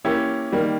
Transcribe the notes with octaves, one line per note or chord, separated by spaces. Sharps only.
E3 A#3 C#4 E4 G4
D#3 G3 A#3